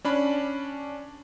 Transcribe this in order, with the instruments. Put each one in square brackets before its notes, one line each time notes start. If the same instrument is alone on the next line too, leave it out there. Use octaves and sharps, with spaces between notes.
[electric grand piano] C#4 D4 B5